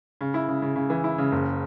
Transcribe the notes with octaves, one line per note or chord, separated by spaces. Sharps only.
C#3
E4
C#3
C#3
C#3
E3
E4
C#3
F#1